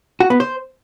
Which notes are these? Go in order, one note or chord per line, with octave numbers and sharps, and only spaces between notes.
F#4
B3
C5